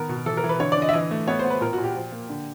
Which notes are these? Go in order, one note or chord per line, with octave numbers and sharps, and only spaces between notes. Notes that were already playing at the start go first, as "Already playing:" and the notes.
Already playing: D#3 B3 A#4
B2
E3 A4
A#4
E3
B4
D3 C#5
D5
D3 D#5
E5
E3 D#5
A3
B3 C#5
C5
B3
B4
A#2 A#4
A#2 F#4
G4
F3
A#3
D3